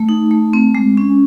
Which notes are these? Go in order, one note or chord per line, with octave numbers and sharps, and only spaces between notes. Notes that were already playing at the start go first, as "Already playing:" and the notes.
Already playing: A3
D#4
A3
C4
G#3
C#4